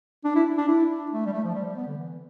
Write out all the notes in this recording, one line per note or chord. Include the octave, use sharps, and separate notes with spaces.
D4
E4
D4
E4
D4
A3
G3
A3
F3
G3
G3
B3
D3
E3